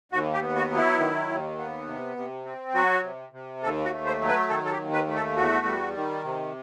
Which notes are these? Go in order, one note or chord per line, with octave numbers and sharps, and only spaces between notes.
D#2 F#4
G4
B3
F#4
F#3
E4
D#3
D#2
B3
C3
C3
C4
F#3 F#4
C3
C3
D#2 A4
F#4
A3
C5
F#3
B4
D#3 A4
A4
G4
D#2
B4
A3
A4
E2 F#4
G3
D#3
C3